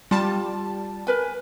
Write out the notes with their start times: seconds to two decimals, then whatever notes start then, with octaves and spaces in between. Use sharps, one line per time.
0.11 G3 F4 A5
1.07 A#4 B4 G#5